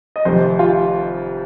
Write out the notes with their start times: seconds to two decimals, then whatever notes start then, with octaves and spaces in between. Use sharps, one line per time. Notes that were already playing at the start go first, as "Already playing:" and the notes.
0.16 D#5
0.25 F1 F2 C3 D#3 C5
0.59 F4